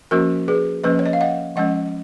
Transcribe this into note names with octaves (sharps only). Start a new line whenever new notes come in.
F3 A#3 C#4 F#4 A#4
G#4 B4
F3 A#3 C#4 B4 D#5
C#5
D#5
F5
D#5 F#5
F3 G#3 C#4 D#5 F#5